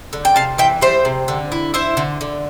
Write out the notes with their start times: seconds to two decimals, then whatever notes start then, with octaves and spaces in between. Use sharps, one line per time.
0.13 D3
0.25 G5
0.36 C3 F5 A5
0.58 E3 E5 G5
0.81 G3 C5 E5
1.05 C3
1.28 D3
1.52 E4
1.74 E4 C5 E5
1.97 D3
2.21 D3